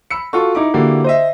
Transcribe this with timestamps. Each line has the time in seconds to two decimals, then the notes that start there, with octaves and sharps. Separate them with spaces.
0.11 B5 E6 C#7
0.33 F4 F#4 A4 C#6
0.55 D#4 E4 D6
0.74 D3 A#3 E4 F#4 G4
1.04 C5 D#5 E5